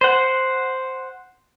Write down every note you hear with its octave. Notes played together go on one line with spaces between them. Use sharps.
C5 F#5